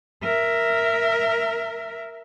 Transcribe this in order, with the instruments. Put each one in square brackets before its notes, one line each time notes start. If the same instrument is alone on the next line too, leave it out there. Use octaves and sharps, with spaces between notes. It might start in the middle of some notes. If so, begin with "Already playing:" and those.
[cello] A#4 E5